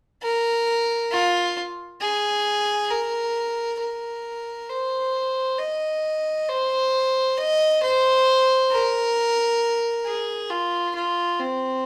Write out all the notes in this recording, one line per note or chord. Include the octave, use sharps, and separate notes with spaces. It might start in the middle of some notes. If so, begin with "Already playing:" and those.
A#4
F4
G#4
A#4
A#4
C5
D#5
C5
D#5
C5
A#4
G#4
F4
F4
C4